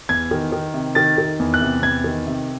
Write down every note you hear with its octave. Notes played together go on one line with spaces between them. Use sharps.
E2 G#6
D#3
D#3
C3
D#3 A6
D#3
E2
F#6
C3
E2 G#6
D#3
C3